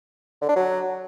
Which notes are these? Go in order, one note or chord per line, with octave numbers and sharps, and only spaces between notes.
D3
D4
F#3